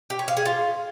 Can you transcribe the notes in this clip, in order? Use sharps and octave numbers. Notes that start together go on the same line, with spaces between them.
G4
C#5
F5
G#4
F4